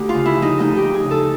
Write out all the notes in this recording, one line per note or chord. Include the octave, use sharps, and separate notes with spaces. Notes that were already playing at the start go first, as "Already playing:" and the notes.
Already playing: D2 G4
F4
C#3
E4
F3 D#4
D2 D#4
G4
D2
G#4
C#3
A4